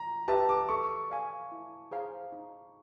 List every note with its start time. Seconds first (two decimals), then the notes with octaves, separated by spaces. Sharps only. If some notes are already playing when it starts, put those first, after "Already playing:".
Already playing: A#5
0.28 G4 B4 E5 A5
0.49 D6
0.69 A4 C#6
1.10 D5 F5 G#5
1.52 E4
1.91 G#4 C5 F5 A#5
2.32 D#4